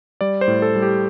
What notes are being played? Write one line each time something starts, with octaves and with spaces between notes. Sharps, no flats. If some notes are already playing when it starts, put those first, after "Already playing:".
G3 D5
C5
A2
A4
G3
G4